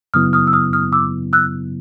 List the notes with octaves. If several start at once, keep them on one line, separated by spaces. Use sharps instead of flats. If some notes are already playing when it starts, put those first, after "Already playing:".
F#2 C#3 F#3 B3 E4 D#6 F6
D#6 F6
E6
D#6 F6
D#6 F6
D6 E6
E6 F#6